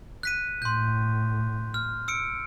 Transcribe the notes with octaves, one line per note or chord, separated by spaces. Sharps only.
F#6 B6 D#7
A2 C6 G6
F6
E6 C#7 D7